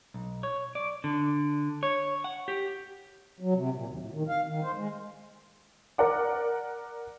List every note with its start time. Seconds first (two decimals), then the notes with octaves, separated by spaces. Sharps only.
0.14 B1
0.43 C#5
0.75 D5
1.04 D3
1.83 C#5
2.24 F#5
2.48 G4
3.40 F#3
3.55 C3
3.74 A#2
3.87 D#2
4.02 A2
4.14 D#3
4.29 F5
4.47 D#3
4.63 C5
4.77 G#3
5.98 A#4 D5 F#5 D6